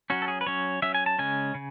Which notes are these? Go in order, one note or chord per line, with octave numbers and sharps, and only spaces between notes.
F#3 C#4 F#4
A4
G#4
B4
F#3 C#4 C#5
F#3 C#4 E5
G#5
A5
C#3 G#3 C#4 G#5
C#3